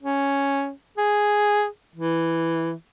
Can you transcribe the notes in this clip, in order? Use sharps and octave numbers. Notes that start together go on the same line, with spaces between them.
C#4
G#4
E3